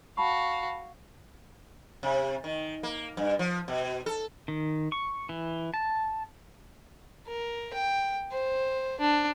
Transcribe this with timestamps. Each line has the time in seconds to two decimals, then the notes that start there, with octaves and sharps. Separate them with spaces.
0.17 F#4 F5 A5 B5 C#6
2.03 C3
2.44 D#3
2.83 A#3
3.17 G2
3.39 F3
3.68 B2
4.06 A4
4.48 D#3
4.92 C#6
5.29 E3
5.74 A5
7.27 A#4
7.73 G5
8.32 C5
9.00 D4